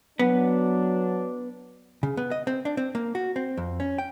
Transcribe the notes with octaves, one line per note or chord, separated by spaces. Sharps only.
F#3 B3 D4
C#3
B3
D#5
C4
D4
C4
A#3
F#4
C4
F2
C#4
G5